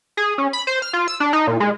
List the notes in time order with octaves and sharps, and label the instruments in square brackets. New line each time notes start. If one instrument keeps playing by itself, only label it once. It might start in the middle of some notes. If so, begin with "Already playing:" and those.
[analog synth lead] G#4
C#4
B5
C5
F6
F4
E6
D4
D#4
A#2
G#3